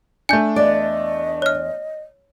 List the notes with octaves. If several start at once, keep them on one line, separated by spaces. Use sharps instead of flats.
A3 D4 G#5 G6
E2 B4 D5 D#5
C#5 F6